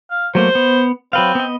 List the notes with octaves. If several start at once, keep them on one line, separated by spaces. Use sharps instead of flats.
F5
F#3 A3 A#3 C5
B3
F#3 C4 B4 F5
B3 D#5